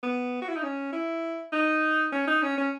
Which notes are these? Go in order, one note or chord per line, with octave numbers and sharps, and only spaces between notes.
B3
F#4
E4
D#4
C#4
E4
D#4
C#4
D#4
C#4
C#4